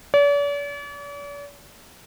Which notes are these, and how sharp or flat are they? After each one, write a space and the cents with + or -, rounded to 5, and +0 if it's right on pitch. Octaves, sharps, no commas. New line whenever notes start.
D5 -45